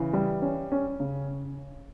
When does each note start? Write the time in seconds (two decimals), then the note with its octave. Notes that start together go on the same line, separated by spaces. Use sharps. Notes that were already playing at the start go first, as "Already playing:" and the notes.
Already playing: C#3 E3
0.13 G3
0.42 C#4
0.72 C#4
1.00 C#3